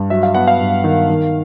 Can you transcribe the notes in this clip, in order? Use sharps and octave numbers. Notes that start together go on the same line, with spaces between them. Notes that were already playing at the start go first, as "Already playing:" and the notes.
Already playing: G2
F#3 E5
F5
B3 F#5
F5
G2
D#3
D#3